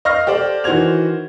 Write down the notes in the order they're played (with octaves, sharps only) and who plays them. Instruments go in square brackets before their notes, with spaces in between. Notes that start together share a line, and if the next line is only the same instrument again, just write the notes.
[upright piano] D#5 F5 C#6 F6 A#6
G4 A4 C5 D5
D#3 E3 F#4 C5 G#6 F7